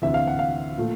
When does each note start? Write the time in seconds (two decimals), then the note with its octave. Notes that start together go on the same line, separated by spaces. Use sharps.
0.02 D2 C3 E3 E5
0.14 F5
0.27 F#5
0.39 F5
0.77 A#2 F3 A3